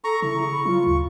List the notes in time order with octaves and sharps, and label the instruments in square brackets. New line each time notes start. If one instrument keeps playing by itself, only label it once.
[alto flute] A4 [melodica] A#5 C#6
[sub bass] C#3 [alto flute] E4 [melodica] C#6
[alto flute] G#4
B5
[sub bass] F#3 [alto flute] F4
[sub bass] D2